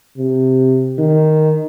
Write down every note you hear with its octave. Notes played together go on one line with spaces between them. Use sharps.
C3
D#3